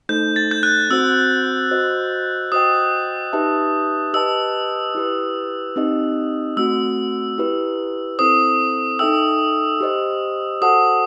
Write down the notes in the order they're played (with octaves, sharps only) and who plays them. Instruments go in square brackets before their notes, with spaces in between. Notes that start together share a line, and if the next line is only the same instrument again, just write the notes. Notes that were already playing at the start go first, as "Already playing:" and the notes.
[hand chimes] A3 D#4 A4 C5 [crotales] G6
[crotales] A6
G6
F#6
[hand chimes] C4 F#4 C5 [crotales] E6
[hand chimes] F#4 C5 D#5
[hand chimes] F#4 C5 D#5 G5 [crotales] D#6
[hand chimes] D#4 G4 B4 E5 A5
[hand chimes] G4 B4 D#5 A5 [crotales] E6
[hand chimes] E4 G4 B4
C4 D#4 G4 D#5
[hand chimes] A3 C4 F#4 [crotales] E6
[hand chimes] E4 G4 B4
[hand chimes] C4 E4 A4 C5 [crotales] D#6
[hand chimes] D#4 A4 E5 G5 [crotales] E6
[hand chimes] G4 C5 D#5
[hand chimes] F#4 A4 C5 F#5 A5 [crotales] D#6